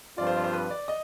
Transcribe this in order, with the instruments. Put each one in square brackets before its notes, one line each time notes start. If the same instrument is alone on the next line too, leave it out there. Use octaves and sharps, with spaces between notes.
[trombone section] G2 F3 C4 F4 [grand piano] D5
[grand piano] C5
D5
C5
B4
D5
D#5